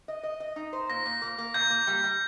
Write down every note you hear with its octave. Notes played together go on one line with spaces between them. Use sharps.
D#5
D#5
D#5
D#4
C5
A#2 A#6
A#2
A#3
A#3
A#2 G6
A#3
G3
G3